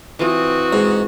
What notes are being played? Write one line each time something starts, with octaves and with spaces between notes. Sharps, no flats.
E3 C4 F4 F#4 D#6
G#2